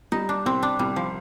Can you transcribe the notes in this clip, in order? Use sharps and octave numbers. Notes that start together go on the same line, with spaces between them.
G3 D#4
D4
C2 C4
D4
C2 G3
F3